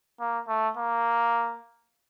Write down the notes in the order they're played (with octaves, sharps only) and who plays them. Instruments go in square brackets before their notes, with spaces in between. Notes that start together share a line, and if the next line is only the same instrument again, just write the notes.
[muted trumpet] A#3
A3
A#3